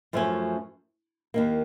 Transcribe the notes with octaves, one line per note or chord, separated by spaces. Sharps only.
F#2 F3 A3 C#4
D#2 D#3 A#3